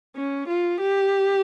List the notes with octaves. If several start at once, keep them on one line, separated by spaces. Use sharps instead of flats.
C#4
F4
G4